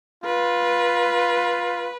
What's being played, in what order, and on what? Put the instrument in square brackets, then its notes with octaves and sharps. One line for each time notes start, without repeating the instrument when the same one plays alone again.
[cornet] F4 [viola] B4